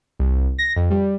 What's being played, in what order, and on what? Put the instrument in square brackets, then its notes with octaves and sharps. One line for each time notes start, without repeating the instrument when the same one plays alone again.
[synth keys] C2
A#6
F2
G3